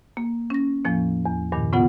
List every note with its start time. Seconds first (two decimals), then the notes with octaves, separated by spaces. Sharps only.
0.17 A#3
0.50 C#4 A#6
0.85 E2 A2 F3 A#3
1.25 E2
1.52 E2 G2 A#2 D#3
1.72 A2 C#3 B3 F4 F#5